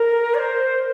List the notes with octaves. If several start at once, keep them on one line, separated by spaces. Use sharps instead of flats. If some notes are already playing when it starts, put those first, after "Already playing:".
Already playing: A#4
D5
C5